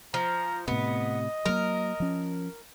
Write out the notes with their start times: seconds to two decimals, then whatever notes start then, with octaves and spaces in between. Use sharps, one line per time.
0.14 F3 A#5
0.68 A2 C3 B3 D#5
1.46 F#3 A#3 A#4
2.00 F3 C#4